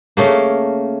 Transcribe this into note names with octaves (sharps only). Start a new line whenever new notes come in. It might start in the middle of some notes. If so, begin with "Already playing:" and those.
C#3 A3 A#3